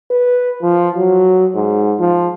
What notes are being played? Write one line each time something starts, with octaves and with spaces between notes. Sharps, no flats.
B4
F3
F#3
G#2
F3